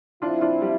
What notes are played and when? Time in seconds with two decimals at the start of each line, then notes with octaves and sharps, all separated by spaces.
0.22 F3 C4 D4 E4 F4
0.41 D4 F4
0.62 G3